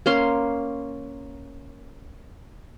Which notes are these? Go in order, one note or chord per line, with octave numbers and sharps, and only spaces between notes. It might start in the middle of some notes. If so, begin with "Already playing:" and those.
A#3 C#4 C6